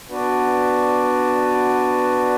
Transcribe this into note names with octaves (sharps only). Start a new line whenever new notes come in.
B3 D4 F#4 B4 D5